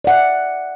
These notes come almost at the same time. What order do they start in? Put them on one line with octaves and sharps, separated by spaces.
D5 F#5 E5